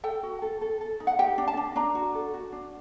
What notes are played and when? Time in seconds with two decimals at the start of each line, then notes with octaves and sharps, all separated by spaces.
0.04 A4 G5
0.23 F#4
0.42 A4
0.61 A4
0.81 A4
1.00 D#4
1.07 F#5
1.19 G4 G5
1.38 D4
1.47 A5
1.57 D4
1.76 D4 A#5
1.95 F#4
2.15 A4
2.34 F#4
2.53 D4